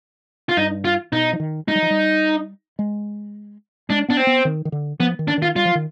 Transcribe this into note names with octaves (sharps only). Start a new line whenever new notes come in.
F4
G2 D#4
F4
B2 D#4
F3
D#3
G#3 D#4
G3
F3
G3
G#3
G#3 D4
B3 D4
C4
B3
D#3
D#3
D3
F3 B3
D#3
D4
D#3 F4
G3 F4
F3
D#3